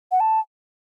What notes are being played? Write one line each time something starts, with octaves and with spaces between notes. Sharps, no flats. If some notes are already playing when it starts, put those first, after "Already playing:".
F#5
A5